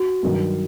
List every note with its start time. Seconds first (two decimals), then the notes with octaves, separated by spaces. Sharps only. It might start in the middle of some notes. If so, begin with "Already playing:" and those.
Already playing: F#4
0.23 G2 D#3 F#3